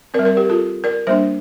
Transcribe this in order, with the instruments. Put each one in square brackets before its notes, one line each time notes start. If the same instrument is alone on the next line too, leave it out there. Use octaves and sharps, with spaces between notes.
[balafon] C4 A#4 D5
G3
A#4 D5
G4 A#4
F4 A4
A#4 D5
G3 A#3 D4 C5 E5